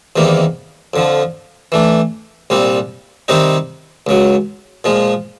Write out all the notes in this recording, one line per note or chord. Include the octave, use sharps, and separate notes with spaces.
E2 C3 D#3 G3 A#3
F2 D3 F3
E3 A3 D4
C2 A#2 G3 C4
C3 D#3 G3 C4 D#4
C#2 C#3 F#3
A#2 F3 G#3